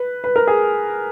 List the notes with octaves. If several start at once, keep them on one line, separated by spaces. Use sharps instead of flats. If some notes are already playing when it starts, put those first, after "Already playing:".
Already playing: B4
B4
A#4
G#4